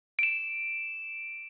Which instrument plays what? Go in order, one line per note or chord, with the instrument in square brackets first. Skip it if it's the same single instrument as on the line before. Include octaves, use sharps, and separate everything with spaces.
[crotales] D7 E7